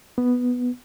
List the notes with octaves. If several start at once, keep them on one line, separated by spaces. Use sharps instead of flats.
B3